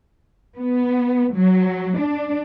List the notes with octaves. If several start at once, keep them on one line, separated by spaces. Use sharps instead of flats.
B3
F#3
D4